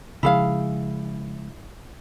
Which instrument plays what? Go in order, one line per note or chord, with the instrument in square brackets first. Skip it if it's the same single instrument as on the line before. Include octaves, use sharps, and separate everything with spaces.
[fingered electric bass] C#3 F3 G#3 [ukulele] E4 G#4 F5